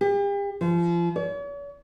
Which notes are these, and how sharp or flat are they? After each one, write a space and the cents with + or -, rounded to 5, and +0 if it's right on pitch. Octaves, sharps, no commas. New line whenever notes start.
G4 +40
F3 -30
C#5 +45